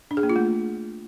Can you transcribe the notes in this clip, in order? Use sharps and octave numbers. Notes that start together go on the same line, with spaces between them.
D4
G#4
A#3
F4
A3